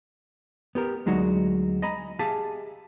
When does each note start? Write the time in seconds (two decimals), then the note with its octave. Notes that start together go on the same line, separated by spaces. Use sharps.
0.75 B3 G4 A#4
1.06 D2 F#3 G#3 D#4 F#4
1.82 D#5 G#5 A#5 B5
2.19 G4 G#4 E5 F5 G#5 A5